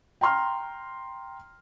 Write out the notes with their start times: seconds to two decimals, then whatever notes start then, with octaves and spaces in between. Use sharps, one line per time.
0.21 G5 A#5 C6 F6